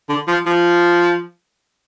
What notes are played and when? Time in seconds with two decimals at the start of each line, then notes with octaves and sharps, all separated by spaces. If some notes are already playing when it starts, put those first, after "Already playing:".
0.09 D3
0.28 F3
0.46 F3